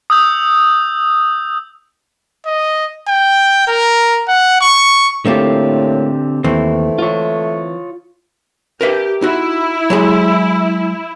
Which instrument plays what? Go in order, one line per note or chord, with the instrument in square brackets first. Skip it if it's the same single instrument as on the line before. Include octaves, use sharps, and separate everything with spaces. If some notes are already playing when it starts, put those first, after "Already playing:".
[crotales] D#6 E6 G6
[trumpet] D#5
G5
A#4
F#5
C#6
[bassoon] A2 [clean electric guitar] D3 C4 G4 [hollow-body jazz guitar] A3 A#3 F4
[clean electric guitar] D#2 [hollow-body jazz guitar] E3 C4 [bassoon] A3
[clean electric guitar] F4 C#5
[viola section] G4 [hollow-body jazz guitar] A#4 B4 E5
[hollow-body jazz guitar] D#4 F#4 [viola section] E4
[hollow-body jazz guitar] F#3 G#3 G#4